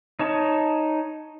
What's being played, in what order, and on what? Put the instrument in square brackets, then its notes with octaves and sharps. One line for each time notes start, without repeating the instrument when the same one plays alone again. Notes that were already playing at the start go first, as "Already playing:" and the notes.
[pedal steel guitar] D#4 C#5 A5